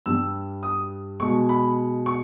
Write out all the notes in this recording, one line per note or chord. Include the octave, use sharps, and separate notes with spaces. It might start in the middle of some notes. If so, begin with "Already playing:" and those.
G2 G3 E6
D#6
B2 G#3 C#6
B5
C#6